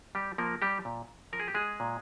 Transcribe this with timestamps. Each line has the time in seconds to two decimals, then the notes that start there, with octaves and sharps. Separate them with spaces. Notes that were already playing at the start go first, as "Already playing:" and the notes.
0.15 G3 G4
0.38 F3 A#3 A#4
0.62 G3 G4
0.85 A#2
1.33 F3 A#4
1.40 G#4
1.48 G4
1.55 G#3 G#4
1.80 A#2